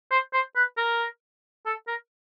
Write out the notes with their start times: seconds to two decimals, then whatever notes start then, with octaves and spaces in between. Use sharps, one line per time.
0.11 C5
0.33 C5
0.56 B4
0.77 A#4
1.66 A4
1.87 A#4